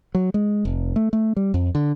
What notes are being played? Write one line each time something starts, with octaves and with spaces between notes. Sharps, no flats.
F#3
G#3
F1
A3
A3
G3
F2
D3